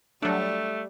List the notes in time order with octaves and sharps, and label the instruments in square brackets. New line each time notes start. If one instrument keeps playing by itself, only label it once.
[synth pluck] F#3 D4 [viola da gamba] G3 [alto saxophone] A3